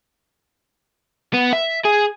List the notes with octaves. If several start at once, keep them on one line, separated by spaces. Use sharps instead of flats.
B3
E5
G#4